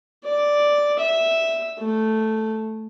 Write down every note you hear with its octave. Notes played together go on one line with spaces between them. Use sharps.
D5
E5
A3